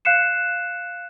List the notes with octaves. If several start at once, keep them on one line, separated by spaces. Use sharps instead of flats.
F5 F#6 C7 C#7 E7